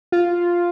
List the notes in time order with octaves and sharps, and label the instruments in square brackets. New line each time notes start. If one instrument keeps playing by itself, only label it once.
[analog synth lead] F4